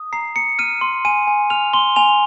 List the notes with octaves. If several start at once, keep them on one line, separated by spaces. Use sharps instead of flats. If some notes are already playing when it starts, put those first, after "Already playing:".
Already playing: D#6
A#5 C7
A#5 C#7
F6 D#7
C6
G#5 D#7
G#5
F6 F7
C6 G7
G#5 F7